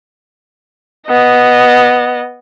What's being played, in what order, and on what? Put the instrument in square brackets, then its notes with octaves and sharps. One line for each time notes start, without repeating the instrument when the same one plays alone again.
[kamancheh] B3 D#5